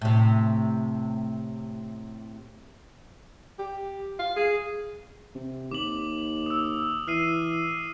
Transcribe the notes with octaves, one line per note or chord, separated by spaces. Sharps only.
A2 C3
G4
F5
G#4
C3
D#2 D6 F#7
D#6 E6
E3 F6 C7 D#7